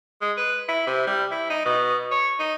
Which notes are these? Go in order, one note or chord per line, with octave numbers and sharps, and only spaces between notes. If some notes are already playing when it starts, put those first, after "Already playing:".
G#3
B4
E4
C3
G3
E4
D#4
B2
C#5
D#4